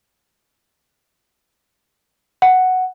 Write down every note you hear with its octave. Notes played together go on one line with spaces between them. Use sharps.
F#5